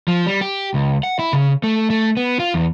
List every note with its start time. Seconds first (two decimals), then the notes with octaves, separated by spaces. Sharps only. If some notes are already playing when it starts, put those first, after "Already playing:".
0.08 F3
0.26 G3
0.41 G4
0.74 C#2
1.03 F#5
1.19 E4
1.33 C#3
1.63 A3
1.90 A3
2.17 B3
2.40 F4
2.54 E2